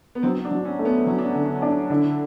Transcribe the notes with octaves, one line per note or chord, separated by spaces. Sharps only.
B3
F#3 C4
D4
F#3
C#4
A3
B3
F#3 C#4
D4
D3 C#4
D4
C#4
D4
D3 E4